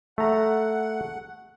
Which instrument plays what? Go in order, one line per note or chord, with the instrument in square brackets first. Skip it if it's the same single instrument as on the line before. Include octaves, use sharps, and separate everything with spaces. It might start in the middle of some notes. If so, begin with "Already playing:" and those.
[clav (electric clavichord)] A3 A#5 [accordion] F#5